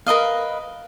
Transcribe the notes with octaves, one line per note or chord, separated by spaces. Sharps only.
A#4 B4 D#5 F5